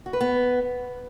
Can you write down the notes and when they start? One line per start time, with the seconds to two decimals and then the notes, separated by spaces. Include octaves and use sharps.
0.06 F#4
0.13 B4
0.21 B3